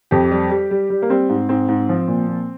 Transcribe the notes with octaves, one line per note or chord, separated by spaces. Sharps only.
F2 G4
G3
G3
G3
G3
A#3
G3 C4
G#2
G#2 C4
G#2
F3
A#2
A#2